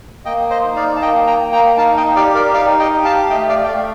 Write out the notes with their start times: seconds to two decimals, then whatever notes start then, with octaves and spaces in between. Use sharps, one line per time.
0.25 A#3 D#5 G5
0.50 C5 D#5
0.64 D#4
0.76 D5 F5
0.96 A5
1.02 A#3 D#5 G5
1.27 G5 A#5
1.40 A#3
1.52 G5 A#5
1.77 D#4 F5 A5
1.97 D#5 G5
2.16 G4 D5 F5
2.35 A#4 D5
2.54 D#4 D5 F5
2.79 D#5 G5
2.92 G4
3.04 F5 A5
3.30 A3 D#5 G5
3.49 D5 F5
3.64 G5
3.67 A3 D5 F5